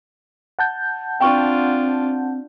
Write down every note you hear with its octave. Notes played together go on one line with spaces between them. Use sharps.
F#5 A5 G6
C4 D4 F4 G5 C#6